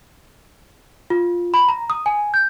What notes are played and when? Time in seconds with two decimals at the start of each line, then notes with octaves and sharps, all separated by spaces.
1.10 F4
1.54 B5
1.68 A#5
1.90 D#6
2.06 G#5
2.34 G6